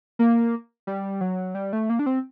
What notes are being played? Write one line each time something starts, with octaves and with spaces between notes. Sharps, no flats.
A#3
G3
F#3
G3
A3
A#3
D4
C4